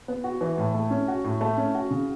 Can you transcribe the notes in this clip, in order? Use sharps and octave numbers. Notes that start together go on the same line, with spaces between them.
B3
F#4
E3
A2
A3
C#4
F#4
A2
A3
C#4
F#4
C#3